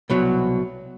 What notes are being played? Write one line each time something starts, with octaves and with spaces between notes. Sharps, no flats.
C2 B2 F#3